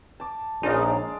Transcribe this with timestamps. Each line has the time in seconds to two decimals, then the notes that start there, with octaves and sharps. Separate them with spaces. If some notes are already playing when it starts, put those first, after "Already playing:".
0.20 A5 D6
0.63 A#1 G#3 C#4 D#4 D5 F5